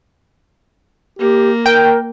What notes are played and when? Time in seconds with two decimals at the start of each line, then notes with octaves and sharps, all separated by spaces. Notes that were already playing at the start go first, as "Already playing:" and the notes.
1.19 A#3 G4
1.66 A#4 G5